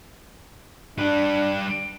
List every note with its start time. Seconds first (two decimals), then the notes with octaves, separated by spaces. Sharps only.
0.99 G3 D4 B4